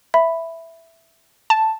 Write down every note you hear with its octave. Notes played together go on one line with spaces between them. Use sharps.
E5 B5
A5